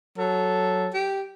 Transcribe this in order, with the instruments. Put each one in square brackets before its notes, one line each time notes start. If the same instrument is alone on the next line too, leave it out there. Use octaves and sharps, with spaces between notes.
[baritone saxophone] F#3 [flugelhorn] A4
[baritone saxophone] G4